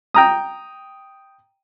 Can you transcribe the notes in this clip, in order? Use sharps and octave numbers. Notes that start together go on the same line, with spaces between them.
G5 A#5 D#6